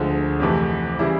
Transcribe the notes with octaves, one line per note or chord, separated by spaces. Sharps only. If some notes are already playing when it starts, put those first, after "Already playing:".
Already playing: D2 D3 F3 G#3
F2 C3 E3 A3
C#3 E3 G3 E4